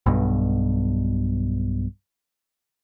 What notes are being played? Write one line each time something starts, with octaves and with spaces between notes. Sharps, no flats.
B1 G2 B2